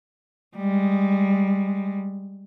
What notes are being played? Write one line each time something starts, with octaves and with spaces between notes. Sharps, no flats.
G3 G#3